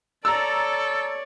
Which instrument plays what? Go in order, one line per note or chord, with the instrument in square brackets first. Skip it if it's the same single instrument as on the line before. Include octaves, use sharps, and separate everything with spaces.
[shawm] A4 [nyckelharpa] C#5 D5 [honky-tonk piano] A#5 E6